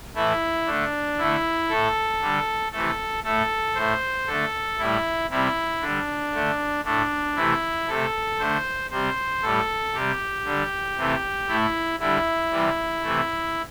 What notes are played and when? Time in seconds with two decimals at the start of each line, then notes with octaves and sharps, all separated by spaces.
0.15 A2 E3 A3 E4
0.67 D3 A3 D4
1.18 D3 A3 E4
1.70 A2 A3 A4
2.21 D3 G3
2.72 C3 E3 A3 A4
3.24 A2 A3 A4
3.75 A2 A3 C5
4.27 D3 A3 A4
4.79 A2 G3 E4
5.30 C3 G3 E4
5.81 D3 G3 D4
6.34 D3 A3
6.84 A2 A3 D4
7.36 C3 E3 A3 E4
7.88 C3 A3 A4
8.39 D3 A3 C5
8.91 C3 G3 C5
9.42 A2 G3 A4
9.94 C3 G3 G4
10.45 D3 G3
10.97 C3 E3 A3
11.48 A2 A3 E4
12.00 D3 G3 E4
12.51 C3 E3 G3
13.03 C3 E3 A3